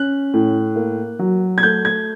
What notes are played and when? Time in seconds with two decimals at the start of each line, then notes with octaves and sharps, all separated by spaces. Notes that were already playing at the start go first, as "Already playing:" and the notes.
Already playing: C#4 F#6
0.34 A2
0.76 A#3
1.19 F#3
1.58 G#6
1.63 A3 G6
1.85 G#6